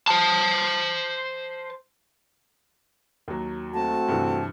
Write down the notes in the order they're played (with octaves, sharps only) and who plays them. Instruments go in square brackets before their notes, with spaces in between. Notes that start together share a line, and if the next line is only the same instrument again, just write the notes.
[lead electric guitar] C5 A5
[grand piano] D#2 F#3
[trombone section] A3 C4 F#4 [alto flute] A5
[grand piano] G2 C3 E3